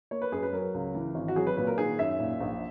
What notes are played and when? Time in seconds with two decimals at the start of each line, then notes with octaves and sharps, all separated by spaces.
0.11 A#3 C#5
0.22 B4
0.32 F#2 G#4
0.43 B4
0.53 F#3 A#4
0.74 C#2
0.95 E3
1.15 G#1
1.28 F#4
1.36 F#3 G#4
1.47 B4
1.57 A#2 B4
1.67 A#4
1.78 D#3 G#4
1.99 F#2 E5
2.20 A#2
2.41 A#1